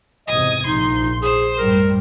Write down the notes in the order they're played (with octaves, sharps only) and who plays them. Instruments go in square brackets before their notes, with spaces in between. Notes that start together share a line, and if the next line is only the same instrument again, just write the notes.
[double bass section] E2 G#2 C3 [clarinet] D#5 [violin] D#6 G#6
[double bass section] A#1 [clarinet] D#4 [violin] C6
[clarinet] G#4 [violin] C5
[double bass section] F#2 A2 G3 [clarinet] A#4